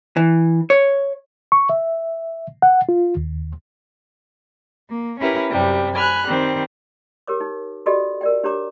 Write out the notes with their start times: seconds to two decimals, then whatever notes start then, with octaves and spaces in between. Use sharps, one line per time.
0.17 E3
0.70 C#5
1.52 C#6
1.69 E5
2.62 F#5
2.89 F4
3.17 D#2
4.89 A#3
5.19 C#4 E4 G4 A#4 B4
5.50 F#2 C3 G3
5.94 G#5 B5 F6 F#6
6.27 D#3 G3 C4
7.27 G4 A#4 C#5 D6
7.41 D#4
7.86 F#4 G4 A4 D5 D#5
8.21 A#4 D5 G5
8.44 D4 G4 C#5 A#5 D6